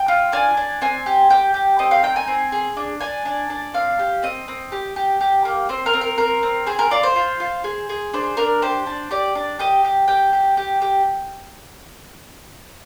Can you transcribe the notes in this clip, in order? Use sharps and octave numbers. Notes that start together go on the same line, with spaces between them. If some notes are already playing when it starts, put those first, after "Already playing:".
Already playing: G5
F4
D4 G#5
D4
C4 G#5
G4
G4 G5
G4
C4 D#5
F5
D#4 G5
G#5
C4
G#4
D4
D4 G#5
D4
D4
C4 F5
G4
C4 D#5
C4
G4
G4
G4
A#3
C4 C5
A#4
C4
A#4
C4 A#4
C4
G#4 C5
A#4
F4 D5
C5
F4
F4
G#4
G#4
D4 C5
D4 A#4
G4 C5
D4
G4 D5
D4
G4 D#5
G4
G4 G5
G4
G4
G4